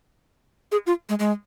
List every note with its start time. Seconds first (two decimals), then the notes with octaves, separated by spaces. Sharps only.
0.72 G#4
0.87 F4
1.09 G#3
1.19 G#3